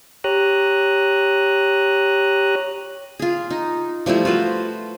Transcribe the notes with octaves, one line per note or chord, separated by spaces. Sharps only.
G4 C#5 A#5 D#6 F#6
F4 G#4
D#4
F3 G3 A3 E4
F4 F#4 B4 C5